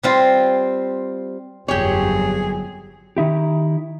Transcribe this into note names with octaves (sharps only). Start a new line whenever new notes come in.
G3 C4 F4
G1 F2 F#3 G4 G#4 C#5
D#3 D#4 E4 G4